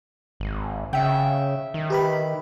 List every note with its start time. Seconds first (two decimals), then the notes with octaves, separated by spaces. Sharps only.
0.40 G#1
0.93 C#3 E5 G5
1.74 D#3
1.90 G4 B4 B5